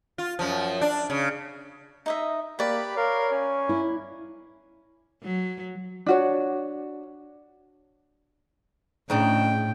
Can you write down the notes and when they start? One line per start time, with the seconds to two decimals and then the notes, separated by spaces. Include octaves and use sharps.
0.18 F4
0.39 F#2 F3
0.81 D4
1.10 C#3
2.06 D#4 D#5 E5
2.59 A#3 G4 B4 D5 B5
2.97 A#4 C#5 F5
3.32 C#4 G#5
3.69 E4
5.23 F#3
6.06 D4 F#4 C#5
9.10 A2 C#3 D4 D#4 G5